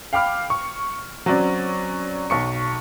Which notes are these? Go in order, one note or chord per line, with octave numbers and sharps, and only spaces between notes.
F5 G5 B5 D6 F6
C#6
F#3 C4 C#4 D5
B1 C#6 C#7